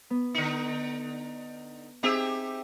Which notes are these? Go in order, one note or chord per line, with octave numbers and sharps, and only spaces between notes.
B3
D3 D#4
C4 D#4 G4 G#4 E5 E6